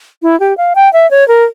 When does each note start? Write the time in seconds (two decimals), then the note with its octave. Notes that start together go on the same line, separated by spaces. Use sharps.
0.22 E4
0.40 G4
0.57 F5
0.75 G5
0.93 E5
1.11 C#5
1.28 A#4